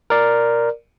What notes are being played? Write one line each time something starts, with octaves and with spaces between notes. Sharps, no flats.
A#4 D5